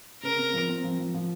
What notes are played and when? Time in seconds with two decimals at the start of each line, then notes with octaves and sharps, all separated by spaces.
0.23 C#3 A#4
0.38 C4
0.53 F3
0.68 C4
0.84 F3
0.99 F3
1.14 F3